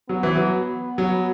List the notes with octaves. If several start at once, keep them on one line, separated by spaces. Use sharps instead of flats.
F#3 B3
E3
F#3
F#3